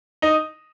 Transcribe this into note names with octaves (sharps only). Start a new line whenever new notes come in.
D#4 D#5